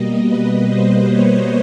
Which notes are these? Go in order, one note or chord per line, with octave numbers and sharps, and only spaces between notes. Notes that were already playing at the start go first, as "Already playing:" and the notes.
Already playing: B2 G3 A#3 D#5
B4
C5
C#5